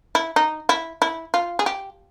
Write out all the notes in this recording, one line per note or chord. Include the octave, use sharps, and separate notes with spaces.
E4
D#4
E4
E4
F4
G#4
G4